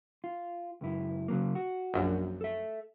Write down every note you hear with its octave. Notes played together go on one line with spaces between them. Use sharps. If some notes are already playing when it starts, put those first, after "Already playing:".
F4
C#2 F#2 E4
C#3 F#3 A#3
F#4
A#1 F#2
A4 E5